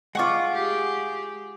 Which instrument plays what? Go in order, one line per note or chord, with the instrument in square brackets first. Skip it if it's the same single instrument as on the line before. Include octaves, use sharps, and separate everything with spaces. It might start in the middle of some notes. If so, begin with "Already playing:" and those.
[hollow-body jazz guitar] G#3 F4 [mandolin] F#5 C#6 D6
[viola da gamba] G4 G#4